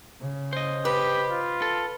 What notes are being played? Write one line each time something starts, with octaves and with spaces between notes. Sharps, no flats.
C#3
C5 D#5
G4 B4
F4
A4